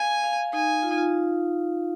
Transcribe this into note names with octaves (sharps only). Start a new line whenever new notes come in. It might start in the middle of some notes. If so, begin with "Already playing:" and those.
Already playing: F5 G#5
F5
D#4 G#5
F4
D#4
F4